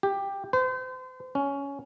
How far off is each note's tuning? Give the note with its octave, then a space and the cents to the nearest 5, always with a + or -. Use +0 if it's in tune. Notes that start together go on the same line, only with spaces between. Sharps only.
G4 +10
C5 -35
C#4 +10